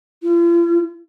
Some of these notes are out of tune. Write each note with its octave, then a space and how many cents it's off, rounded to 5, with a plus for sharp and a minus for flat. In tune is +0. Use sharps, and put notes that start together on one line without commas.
F4 -45